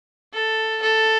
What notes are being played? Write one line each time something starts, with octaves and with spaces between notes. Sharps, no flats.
A4
A4